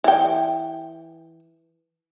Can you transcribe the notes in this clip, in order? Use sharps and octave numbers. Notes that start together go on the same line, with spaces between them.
E3 G5